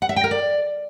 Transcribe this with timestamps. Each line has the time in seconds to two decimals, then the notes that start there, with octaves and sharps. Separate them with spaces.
0.02 F#5
0.09 E5
0.16 G5
0.24 A#4
0.31 D5